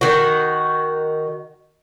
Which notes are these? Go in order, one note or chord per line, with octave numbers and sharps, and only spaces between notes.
D#3 F#4